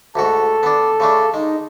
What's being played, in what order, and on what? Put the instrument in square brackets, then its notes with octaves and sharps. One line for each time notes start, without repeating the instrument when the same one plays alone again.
[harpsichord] D2 G#2 F#4 [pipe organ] A4
[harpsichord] B3 D4
C#3 A3 D4
[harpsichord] G#3 [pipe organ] D#4